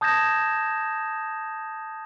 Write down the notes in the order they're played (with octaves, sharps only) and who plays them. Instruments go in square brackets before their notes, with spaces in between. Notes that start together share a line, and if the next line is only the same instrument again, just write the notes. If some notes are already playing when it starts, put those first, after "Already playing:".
[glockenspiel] A5 D#6 G6 G#6 A#6 E7